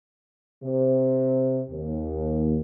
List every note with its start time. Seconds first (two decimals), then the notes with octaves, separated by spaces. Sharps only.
0.64 C3
1.71 D#2